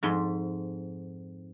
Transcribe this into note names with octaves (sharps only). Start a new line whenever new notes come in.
F2 G#2 B5 C6